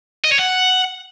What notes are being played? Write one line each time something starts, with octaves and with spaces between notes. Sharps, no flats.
D#5
C#5
F#5